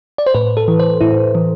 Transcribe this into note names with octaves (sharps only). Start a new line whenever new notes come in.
D5
C5
A2 B4
A4
E3
C5
A2 E4
E3